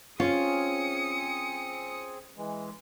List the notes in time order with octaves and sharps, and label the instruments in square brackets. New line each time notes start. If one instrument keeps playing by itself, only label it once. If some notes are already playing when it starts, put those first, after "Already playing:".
[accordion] C4 G#4 [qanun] C#4 [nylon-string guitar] F4 [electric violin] D#6 C#7
[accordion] E3 G#3